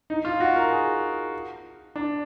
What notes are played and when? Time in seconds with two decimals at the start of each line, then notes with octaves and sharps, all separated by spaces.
0.10 D#4
0.25 F4
0.40 F#4
0.56 A#4
0.71 G#4
1.96 D4